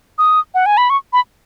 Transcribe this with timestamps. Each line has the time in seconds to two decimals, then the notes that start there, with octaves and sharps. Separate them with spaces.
0.18 D#6
0.55 F#5
0.66 G#5
0.77 B5
0.90 C#6
1.13 B5